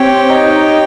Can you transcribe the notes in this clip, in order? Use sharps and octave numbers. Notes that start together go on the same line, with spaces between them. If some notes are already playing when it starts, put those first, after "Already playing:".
Already playing: C4 G4 C#5 G5
D#4